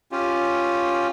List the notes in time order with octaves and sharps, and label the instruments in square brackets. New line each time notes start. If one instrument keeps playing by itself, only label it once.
[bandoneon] C#4 F4 G4